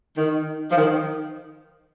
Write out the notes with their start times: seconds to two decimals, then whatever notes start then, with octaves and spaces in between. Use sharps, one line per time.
0.18 D#3
0.71 F3
0.77 D#3